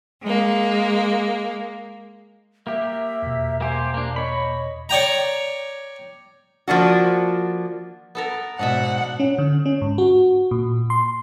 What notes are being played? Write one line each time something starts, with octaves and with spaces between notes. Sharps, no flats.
G#3 A#3
A#3 G4 E5
E2 B2
A#3 G4 C5 G#5
A#3 D4
C#5 D#5 B5
C#5 D5 G5 A#5
F3 A#3 D4 F#4
B3 A4 A#4
G#2 B2 D4 D#5 E5 F#5
C#4
D3
C#4
G#2
F#4
A#2
C6